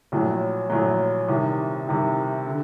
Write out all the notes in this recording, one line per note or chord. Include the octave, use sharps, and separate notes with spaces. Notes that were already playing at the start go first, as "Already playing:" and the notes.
A#1 A2 F#3
A#1 A2 F#3
C2 C3 D#3
C2 C3 D#3
D3